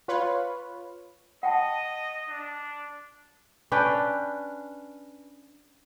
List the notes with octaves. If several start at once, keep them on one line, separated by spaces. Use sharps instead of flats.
F4 B4 C#5
D#5 F#5 G5 A5
D4
C#4 D4 B4 G5